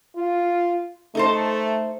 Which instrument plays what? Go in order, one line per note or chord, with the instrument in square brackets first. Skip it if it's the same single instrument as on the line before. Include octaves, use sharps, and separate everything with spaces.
[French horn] F4
[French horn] A3 [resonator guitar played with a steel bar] D#4 A4 C5